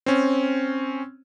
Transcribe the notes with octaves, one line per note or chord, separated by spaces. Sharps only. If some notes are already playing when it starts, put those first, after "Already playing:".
C4 C#4